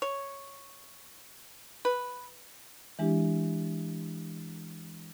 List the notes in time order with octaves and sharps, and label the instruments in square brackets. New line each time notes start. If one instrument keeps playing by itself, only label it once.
[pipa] C#5
B4
[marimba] E3 G#3 D4 E4 G4